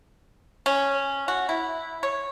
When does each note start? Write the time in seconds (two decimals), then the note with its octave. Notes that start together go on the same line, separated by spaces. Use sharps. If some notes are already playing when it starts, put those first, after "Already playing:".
0.66 C#4
1.28 F#4
1.49 E4
2.03 C#5